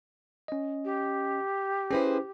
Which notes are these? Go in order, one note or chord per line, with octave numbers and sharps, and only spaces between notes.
C#4 D#5
G4
C#4 E4 G#4 B4 C5